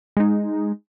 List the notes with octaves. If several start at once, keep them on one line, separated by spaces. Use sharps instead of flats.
G#3 D#4